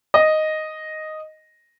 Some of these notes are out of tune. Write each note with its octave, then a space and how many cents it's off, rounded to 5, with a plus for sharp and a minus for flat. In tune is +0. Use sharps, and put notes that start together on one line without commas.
D#5 +0